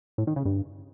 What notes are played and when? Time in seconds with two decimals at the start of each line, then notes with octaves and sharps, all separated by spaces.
0.18 A2
0.27 D#3
0.36 C#3
0.45 G2